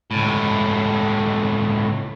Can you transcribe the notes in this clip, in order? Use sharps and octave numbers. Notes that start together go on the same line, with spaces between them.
C#2 A2